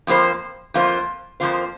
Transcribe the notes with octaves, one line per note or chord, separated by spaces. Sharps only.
F2 F3 A#3 F4 C5
F2 F3 A#3 F4 C5
F2 F3 A#3 F4 C5